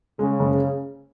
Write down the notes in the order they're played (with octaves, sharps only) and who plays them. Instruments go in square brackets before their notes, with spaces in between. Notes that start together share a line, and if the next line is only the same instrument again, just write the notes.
[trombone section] C#3 [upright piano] G#3
[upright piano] F#1